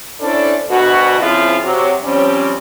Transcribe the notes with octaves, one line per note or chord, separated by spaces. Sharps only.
C#4 D4 E4 A4 C5 D5
D2 B2 F#4
C#3 F3 C4 E4 F4 G#4
C3 F#3
F3 G3 C4 C#4